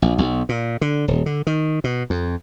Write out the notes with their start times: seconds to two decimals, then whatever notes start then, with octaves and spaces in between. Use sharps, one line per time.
0.02 A#1
0.18 B1
0.49 A#2
0.81 D3
1.08 D#1
1.26 D3
1.47 D#3
1.84 B2
2.10 F2